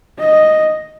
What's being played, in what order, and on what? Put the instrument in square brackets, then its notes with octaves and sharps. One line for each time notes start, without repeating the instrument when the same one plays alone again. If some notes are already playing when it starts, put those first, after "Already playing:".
[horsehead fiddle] D#5